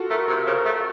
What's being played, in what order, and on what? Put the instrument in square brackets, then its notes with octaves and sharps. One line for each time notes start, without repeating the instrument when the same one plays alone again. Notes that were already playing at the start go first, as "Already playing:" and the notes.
Already playing: [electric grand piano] F4 F#4 A4
[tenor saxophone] A3 [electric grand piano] A#4
[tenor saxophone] C3 [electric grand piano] A#4
[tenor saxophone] C#3 [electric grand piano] C5
[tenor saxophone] A3